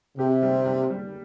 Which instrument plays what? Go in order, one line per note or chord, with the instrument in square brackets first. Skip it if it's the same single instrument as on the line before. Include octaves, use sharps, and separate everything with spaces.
[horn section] C3 [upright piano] G4
[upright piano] G3
G3
G3